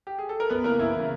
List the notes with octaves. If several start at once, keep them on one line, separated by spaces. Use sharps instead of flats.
G4
G#4
A4
A#4
F#2 B3 B4
C#3 E3 A#3 A#4
F#2 E3 E4
C#3 E3